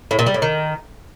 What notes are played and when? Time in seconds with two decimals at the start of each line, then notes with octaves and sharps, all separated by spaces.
0.11 A2
0.19 A#2
0.26 G3
0.34 A2
0.42 D#3